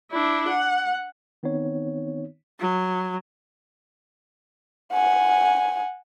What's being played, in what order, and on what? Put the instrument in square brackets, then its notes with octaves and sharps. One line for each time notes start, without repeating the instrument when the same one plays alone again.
[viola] D4 E4
F#5
[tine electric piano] D#3 B3 C4 D#4 C#5
[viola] F#3
[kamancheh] F#5 G#5